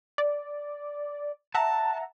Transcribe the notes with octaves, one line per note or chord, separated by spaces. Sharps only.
D5
E5 F#5 A5 A#5